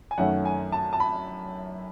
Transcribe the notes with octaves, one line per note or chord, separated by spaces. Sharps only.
G#5
F#2 D#3 A3 C#4 F#5
G#5
A5
A5
B5